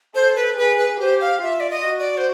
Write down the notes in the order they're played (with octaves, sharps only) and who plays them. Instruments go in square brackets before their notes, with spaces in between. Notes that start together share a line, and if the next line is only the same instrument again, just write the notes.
[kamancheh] A4 [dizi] C5
[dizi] B4
[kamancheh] G#4 [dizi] B4
[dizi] B4
[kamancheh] G4 [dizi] C5
[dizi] F5
[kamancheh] F4 [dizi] E5
[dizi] D5
D#5
[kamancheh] F#4
[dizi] D5
C5